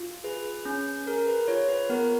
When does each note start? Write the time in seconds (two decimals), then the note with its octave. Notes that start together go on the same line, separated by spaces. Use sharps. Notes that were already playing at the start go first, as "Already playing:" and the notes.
Already playing: F4
0.24 G#4 B4
0.65 C#4
1.07 G#4 A#4
1.28 B4
1.48 F4 C#5
1.69 B4
1.89 B3 A#4